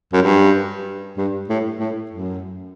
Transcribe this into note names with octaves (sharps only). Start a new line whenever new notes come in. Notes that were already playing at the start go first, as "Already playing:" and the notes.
F#2
G2
G2
A2
A2
F#2